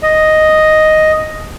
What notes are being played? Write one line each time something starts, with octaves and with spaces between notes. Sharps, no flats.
D#5